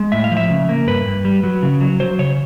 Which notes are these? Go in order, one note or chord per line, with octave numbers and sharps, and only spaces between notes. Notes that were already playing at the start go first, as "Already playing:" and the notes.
Already playing: G#3
A2 E5
F5
F3
E5
C#3
A#3
G2 B4
G2
G3
F#3
C#3
F#3
F#3 C5
C#3 C#5